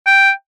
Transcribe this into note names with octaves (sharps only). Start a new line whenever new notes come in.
G5